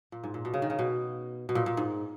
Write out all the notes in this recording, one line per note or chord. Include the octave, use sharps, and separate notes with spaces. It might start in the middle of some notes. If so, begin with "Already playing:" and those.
A#2
G#2
A#2
B2
C#3
D#3
C#3
B2
B2
A#2
A#2
G#2